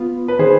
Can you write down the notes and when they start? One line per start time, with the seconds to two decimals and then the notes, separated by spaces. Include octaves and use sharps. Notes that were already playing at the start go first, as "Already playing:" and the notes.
Already playing: B3 F4
0.28 B4
0.39 D#3 G#4 C5